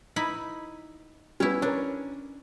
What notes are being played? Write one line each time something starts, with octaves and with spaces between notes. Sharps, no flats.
D#4 E4 B5
G3 B3 C#4 E4
C#4 D4 A#4